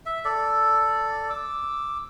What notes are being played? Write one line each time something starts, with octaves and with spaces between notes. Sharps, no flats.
E5
A4 D5
D6 E6